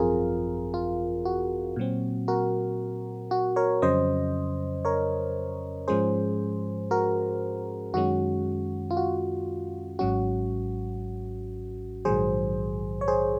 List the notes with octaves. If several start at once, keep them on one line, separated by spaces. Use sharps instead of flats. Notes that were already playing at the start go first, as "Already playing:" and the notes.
Already playing: G#1 F#2 F3 C4 F4 G#4 A#4
F4
F#4
A#2 F#3 C4
F#4 A#4
F#4
A#4 C#5
F2 C#3 F#3 C#4 C5 D#5
A#4 C#5
G#2 F3 G#3 C#4 G#4 C5
F#4 A#4
F#2 D#3 G#3 C#4 F#4
F4
F#4
G#1 G#2 F#3 C#4 F#4
A#1 G#2 D#3 F#3 G#4 C5
C#5
G#4 C5